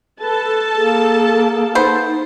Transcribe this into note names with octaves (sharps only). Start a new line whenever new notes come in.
A4 B4 A5
A#3 G#4
B3 D#4 C5